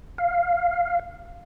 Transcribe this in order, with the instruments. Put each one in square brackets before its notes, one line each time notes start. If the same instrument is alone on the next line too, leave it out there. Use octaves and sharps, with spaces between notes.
[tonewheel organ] F5